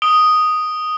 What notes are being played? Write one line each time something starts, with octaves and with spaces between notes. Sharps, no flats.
D#6 D7 G7